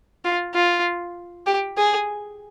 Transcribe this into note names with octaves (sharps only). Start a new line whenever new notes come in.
F4
F4
G4
G#4